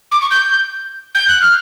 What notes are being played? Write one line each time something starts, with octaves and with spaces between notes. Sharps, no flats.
D6
C#6
G6
G6
F#6
F6